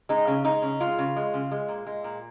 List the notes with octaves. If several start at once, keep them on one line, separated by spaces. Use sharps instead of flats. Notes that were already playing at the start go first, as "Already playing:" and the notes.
G#3 D#4
C#3
G#3 D#4
C#3
G#3 F4
C#3
G#3
C#3
G#3
A#2
G#3
A#2